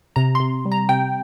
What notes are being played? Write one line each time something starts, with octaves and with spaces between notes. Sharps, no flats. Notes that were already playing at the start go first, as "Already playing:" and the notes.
C3 A#5
C6
C3
G3
A#5
C3 G5